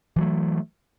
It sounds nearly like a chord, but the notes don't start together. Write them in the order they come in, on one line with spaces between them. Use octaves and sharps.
E3 F#3 A3